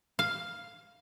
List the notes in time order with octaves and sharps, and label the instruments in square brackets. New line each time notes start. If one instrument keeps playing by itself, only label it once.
[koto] F5